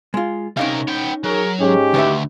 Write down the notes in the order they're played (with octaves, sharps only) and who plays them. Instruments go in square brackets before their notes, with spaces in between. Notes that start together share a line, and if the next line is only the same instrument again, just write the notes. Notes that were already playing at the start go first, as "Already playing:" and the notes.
[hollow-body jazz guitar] G#3 F4
[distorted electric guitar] C3 A#4 [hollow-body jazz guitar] C#4 D#4 F5
[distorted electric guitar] B3 G5
[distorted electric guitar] F#3 [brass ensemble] G#4 A#4
[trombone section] G#2 G#3 C#4 [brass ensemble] D#4 G4
[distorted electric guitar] D2 [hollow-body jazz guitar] D#3 B4 E5